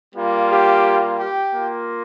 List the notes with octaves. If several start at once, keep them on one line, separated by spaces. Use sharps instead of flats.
G3 A#3 F4
G4
G4
A#3 F4